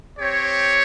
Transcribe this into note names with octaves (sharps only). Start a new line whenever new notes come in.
C4 G4 C#5